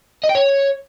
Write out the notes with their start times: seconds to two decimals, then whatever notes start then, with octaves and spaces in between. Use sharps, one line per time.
0.24 D#5
0.29 G5
0.35 C#5